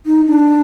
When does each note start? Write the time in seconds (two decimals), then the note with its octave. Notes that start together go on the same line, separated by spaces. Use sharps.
0.06 D#4
0.27 D4